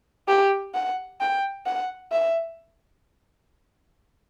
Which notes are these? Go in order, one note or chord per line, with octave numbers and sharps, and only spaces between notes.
G4
F#5
G5
F#5
E5